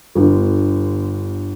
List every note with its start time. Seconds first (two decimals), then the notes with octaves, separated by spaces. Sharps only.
0.15 G1 D3 B3